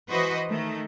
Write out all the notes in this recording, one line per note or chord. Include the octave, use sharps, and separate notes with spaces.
E3 F#4 B4 C5 D#5
D#3 A3